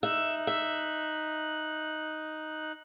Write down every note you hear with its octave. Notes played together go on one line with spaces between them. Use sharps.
D#4 E5 F#6
E5